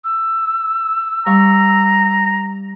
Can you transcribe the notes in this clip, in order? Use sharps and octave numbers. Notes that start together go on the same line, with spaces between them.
E6
G3 F5 A#5 C#6